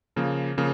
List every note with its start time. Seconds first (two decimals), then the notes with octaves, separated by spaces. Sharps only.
0.16 C#3 F3 A#3
0.57 C#3 F3 A#3